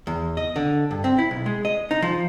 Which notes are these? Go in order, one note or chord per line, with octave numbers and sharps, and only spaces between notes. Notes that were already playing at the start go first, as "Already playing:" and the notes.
E2
D#5
D3
G2
C4
E4
B1
G#3
D#5
D#4
F3